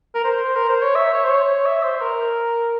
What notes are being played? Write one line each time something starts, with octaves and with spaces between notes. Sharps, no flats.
A#4
C5
A#4
C5
C#5
E5
C#5
C5
C#5
E5
C5
C5
A#4